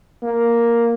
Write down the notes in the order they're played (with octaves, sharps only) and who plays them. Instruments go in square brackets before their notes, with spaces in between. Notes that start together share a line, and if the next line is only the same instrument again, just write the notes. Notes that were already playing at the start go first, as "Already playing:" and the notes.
[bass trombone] A#3